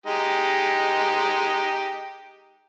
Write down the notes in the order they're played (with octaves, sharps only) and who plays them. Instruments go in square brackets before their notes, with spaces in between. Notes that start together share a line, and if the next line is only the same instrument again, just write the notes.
[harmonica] G#3 D#4 G4